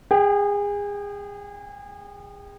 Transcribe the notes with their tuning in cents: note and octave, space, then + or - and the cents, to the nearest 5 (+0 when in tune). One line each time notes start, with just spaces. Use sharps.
G#4 -30 G5 +0